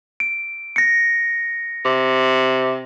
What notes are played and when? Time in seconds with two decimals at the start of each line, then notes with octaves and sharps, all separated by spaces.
0.20 D7
0.76 A#6 C#7
1.85 C3